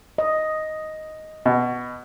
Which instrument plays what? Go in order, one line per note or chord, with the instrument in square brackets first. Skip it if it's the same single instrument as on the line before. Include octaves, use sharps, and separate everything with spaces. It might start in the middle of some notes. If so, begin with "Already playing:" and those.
[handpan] D#5
[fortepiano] B2